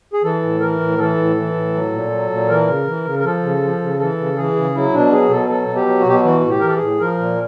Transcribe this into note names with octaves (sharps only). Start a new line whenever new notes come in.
G#4
E3 A4
A2
E3 A#4
A2
E3 A4
A2
E3
A2
F#3
A#2
F#3
A#2
E3 A#4
C#3
E3
C#3
A#4
F3 A4
C#3
F3
C#3
E3 A4
C#3
E3 G#4
C#3
F#3 E4
B2 D4
F#3 G#4
B2 A4
F#3 A4
B2
G4
F#3
F#4
B2 G4
F#4
E3 F#4
A2 F#4
G4
E3 A#4
A4
G#4
A2
F3 A#4
A#2